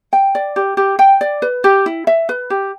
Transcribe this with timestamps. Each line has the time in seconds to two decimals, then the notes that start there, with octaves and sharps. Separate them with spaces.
0.13 G5
0.35 D5
0.56 G4
0.77 G4
0.99 G5
1.21 D5
1.42 B4
1.64 G4
1.86 E4
2.07 E5
2.29 B4
2.50 G4